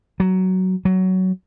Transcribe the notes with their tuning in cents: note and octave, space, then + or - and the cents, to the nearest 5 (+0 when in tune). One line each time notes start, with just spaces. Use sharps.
F#3 +10
F#3 +15